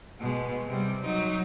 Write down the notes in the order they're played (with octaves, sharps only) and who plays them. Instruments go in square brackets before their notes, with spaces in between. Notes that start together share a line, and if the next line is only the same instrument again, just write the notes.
[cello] B2 G#3
C3 G3
F#3 D#4